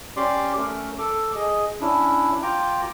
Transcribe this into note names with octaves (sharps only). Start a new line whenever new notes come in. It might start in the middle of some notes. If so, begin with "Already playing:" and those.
C#4 G4 D5 C6 D6
A3 C#4 A#4
A4 D6
G#4 D#5
C#4 D4 E4
F4 G5 A#5 D6